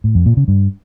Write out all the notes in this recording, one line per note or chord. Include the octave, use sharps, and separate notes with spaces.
A2
F2
A#2
C#3
G2